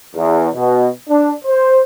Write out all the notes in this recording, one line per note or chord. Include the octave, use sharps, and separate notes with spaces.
E2
B2
D4
C5